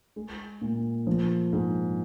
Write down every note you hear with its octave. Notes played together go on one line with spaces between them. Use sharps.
G#3
A#2
F3
G#2